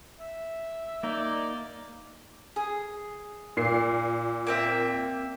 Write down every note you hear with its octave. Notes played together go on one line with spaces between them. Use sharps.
E5
A#3 D#4 D5
G#4
A#2 C7
A#3 C4 E5